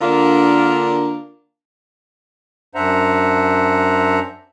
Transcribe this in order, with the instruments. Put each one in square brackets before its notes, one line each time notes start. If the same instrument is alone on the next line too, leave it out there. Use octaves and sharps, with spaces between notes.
[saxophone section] D3 A#3 D4 F4 A#4
[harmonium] F#2 D4 C5 E5 F#5 A#5